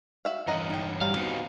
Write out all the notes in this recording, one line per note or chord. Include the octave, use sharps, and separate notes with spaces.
F#4 E5 F5
G2 E3 C#4 A#4 D#5 F#5
D#4 G5
F#3 G3 F5
B3 C4 D#4 F#4